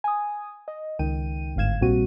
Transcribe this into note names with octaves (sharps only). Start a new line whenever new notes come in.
G#5 D#6
D#5
C#2 D#3 G5 D#7
G1 G#2 F5 G#6 E7
A#1 A#2 G3 C4 F#4 D#7